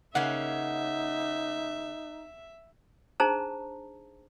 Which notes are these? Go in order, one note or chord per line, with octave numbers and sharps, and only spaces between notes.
C#3 A#3 C#4 D#4 E5 F#5
D4 D#4 G#4 C5 A5 A#5